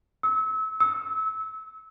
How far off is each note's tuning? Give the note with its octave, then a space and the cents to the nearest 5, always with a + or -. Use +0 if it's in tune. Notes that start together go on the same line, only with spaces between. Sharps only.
E6 -30
E6 -25